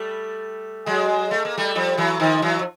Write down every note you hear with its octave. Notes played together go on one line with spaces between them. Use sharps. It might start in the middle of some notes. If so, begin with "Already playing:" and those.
Already playing: G3 A3
F#3 G#3
A3
A#3
G3 A3
F3 G3
E3 F#3
D#3 F3
E3 F#3
F3